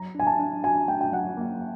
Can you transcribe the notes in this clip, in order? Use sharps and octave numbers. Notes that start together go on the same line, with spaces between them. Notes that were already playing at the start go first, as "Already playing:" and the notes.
Already playing: F#3 A#5
D4 G#5
A5
D4
F#4 G#5
A3 G5
G5
F#3 F#5
A#3